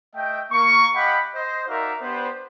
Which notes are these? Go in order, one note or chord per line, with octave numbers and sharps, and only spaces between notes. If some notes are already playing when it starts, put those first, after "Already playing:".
A3 D#5 E5 G5
A#3 C#6
G4 D#5 F5 F#5 B5
C5 D#5
D#4 F#4 A#4 D5 E5 F5
B3 D4 G4 B4 C5